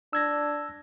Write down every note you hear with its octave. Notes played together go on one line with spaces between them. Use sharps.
D4 E6 G#6 A#6